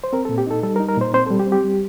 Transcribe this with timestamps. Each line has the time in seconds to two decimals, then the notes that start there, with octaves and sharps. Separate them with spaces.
0.04 C5
0.13 C4 A#4
0.25 A4
0.29 A#2
0.38 G4
0.47 D#4 A4
0.63 G3 A4
0.76 A#4
0.80 D#4
0.89 A#4
0.97 A#2 C5
1.14 C4 C5
1.26 A4
1.30 G3
1.39 G4
1.47 C4
1.52 G4
1.64 G3